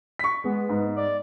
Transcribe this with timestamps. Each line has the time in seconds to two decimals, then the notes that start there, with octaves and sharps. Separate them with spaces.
0.19 C#6 B6
0.44 G#3 B3
0.69 G#2
0.96 D5